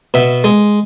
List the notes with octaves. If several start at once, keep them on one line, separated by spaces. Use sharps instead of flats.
B2 E5
G#3